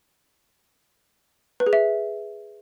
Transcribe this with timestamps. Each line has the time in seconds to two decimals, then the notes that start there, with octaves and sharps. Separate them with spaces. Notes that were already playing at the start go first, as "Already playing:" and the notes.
1.60 B4
1.66 G#4
1.73 E5